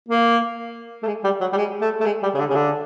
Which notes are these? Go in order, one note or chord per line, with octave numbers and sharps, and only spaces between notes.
A#3
A3
G#3
G3
F#3
G3
G#3
A3
A3
G#3
G3
C#3
D3
C#3
D3